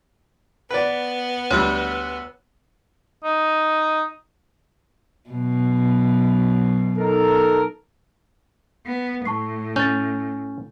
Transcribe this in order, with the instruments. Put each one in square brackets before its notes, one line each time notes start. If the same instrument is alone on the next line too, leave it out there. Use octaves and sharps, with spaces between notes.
[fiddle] B3 [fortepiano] B4 D5
[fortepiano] D2 G3 [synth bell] C#5 E6 F#6
[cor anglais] D#4
[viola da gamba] F#2 B2
[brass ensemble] D#4 A4 A#4
[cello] B3
[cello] A2 [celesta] A5 C#6 C7
[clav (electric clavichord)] C#4 [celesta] G6 A6